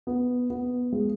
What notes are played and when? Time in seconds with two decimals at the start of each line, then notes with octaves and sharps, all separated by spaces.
0.07 B3
0.50 B3
0.92 G#3